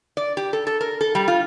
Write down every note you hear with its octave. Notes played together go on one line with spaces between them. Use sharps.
D5
G4
A4
A4
A#4
A4
G3
F4